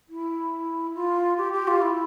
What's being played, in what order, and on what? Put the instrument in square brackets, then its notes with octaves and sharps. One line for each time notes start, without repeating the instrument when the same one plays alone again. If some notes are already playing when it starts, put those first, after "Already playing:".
[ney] E4
F4
G4
G4
F4
E4